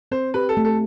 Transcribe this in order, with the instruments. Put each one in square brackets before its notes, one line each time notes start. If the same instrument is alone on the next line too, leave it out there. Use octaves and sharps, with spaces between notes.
[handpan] C4 [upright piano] C5
[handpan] G4 [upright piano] B4
[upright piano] A4
[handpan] A3
[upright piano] A4